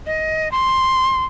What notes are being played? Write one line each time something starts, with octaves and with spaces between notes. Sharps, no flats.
D#5
C6